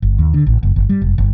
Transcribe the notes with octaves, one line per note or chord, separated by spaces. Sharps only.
G1
D#2
D3
A1
F#1
G1
G3
F1
G1